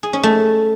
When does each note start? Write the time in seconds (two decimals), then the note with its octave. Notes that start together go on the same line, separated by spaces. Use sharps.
0.03 G#4
0.13 C#4
0.23 A3